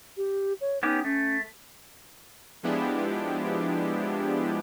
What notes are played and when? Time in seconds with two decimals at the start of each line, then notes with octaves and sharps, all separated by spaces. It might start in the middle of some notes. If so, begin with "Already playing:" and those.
0.17 G4
0.61 C#5
0.83 B3 C#4 D#4 G4
1.05 A3 C#4
2.63 F3 G#3 B3 D4 E4 G4